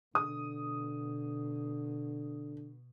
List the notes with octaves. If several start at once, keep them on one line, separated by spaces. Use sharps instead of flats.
B2 D3 D#6